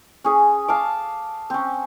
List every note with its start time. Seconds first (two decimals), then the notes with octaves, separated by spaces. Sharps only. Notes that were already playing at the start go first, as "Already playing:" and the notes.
0.24 C#4 G#4 G#5
0.68 F5 A5 D6
1.50 C4 C#4